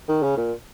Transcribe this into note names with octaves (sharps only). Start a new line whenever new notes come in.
D#3
C#3
A#2